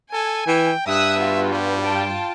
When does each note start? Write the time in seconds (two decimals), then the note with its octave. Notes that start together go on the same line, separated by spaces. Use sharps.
0.13 A4 G#5
0.47 E3 G5
0.87 G2 E5 D#6 E6 F#6
1.18 B3 F4 F#4
1.51 G3
1.82 F4 G5 A5